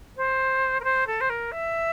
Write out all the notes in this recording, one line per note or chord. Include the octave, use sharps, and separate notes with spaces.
C5
A#4
C5
A4
C5
A#4
E5